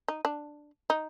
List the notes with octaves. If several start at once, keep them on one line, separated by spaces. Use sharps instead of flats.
D#4
D4
D#4